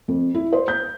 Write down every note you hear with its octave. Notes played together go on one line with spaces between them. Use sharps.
F2
E4
C5
G6